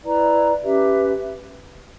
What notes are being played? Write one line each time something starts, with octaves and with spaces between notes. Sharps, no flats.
E4 B4 D5 A#5
C#4 G4 B4 E5